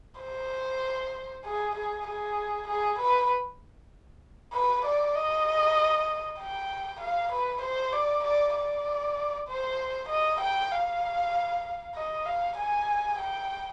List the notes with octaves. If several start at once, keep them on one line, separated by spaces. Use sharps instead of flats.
C5
G#4
G#4
G#4
G#4
B4
B4
D5
D#5
G5
F5
B4
C5
D5
D5
D5
C5
D#5
G5
F5
D#5
F5
G#5
G5